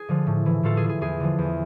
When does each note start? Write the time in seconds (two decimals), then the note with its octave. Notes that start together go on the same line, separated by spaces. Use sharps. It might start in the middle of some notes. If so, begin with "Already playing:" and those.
Already playing: G#4
0.09 D3 F3
0.27 A2
0.46 E3
0.63 A2 F4 A4
0.77 G#4
0.83 E3
0.89 G#4
1.01 E2 G#4
1.20 D3 F3
1.38 E2